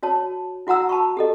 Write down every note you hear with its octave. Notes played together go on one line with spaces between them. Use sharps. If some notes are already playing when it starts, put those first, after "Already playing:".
F#4 C#5 A5
E4 F#4 F#5 A#5 E6
A5 B5 C#6
G4 A4 D#5